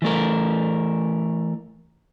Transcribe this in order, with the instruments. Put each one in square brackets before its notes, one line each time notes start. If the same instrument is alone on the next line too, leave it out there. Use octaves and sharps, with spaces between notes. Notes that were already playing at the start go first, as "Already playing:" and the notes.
[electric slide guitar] E3 A3 A#4